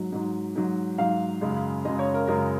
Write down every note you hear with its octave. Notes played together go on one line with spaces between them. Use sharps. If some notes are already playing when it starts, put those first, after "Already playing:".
Already playing: G#2 F#3
G#2 F#3
G#2 F#3
G#2 F#3 F5
F#2 C#3 G#3
F#2 C#3 G#3 D#5
C#5
A#4
F#2 C#3 G#3 A#4